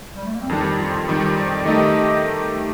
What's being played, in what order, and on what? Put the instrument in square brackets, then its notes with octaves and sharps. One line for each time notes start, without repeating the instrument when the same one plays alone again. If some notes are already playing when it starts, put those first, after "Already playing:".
[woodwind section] G3
A3
A#3
C4
[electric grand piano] F2 D#3 G3 [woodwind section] D4
[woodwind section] F4
[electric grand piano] F2 D#3 G3 [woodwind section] F4
[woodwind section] C5
D5
[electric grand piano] D#3 A3 D#4 G4 [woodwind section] D#5